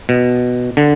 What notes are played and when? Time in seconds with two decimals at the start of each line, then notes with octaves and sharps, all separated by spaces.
0.09 B2
0.77 D3